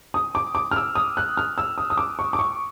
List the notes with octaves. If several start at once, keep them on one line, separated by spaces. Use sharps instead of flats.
D#6
D6
D6
F6
E6
D#6
F#6
F6
E6
D#6
D#6
D6
C#6
D6
C#6